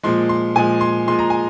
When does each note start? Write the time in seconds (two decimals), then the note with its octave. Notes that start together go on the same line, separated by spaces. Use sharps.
0.03 A#2 F3 G#3 C6
0.29 C6
0.55 A#2 F3 G#3 G#5
0.81 C6
1.08 A#2 F3 G#3 C6
1.19 A#5
1.30 G#5